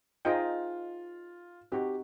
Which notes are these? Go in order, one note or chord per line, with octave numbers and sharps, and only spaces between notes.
D#4 F4 G#4 C5 D#5 G5
C4 D#4 F#4 G4